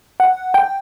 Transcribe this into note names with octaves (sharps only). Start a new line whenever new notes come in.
F#5
G5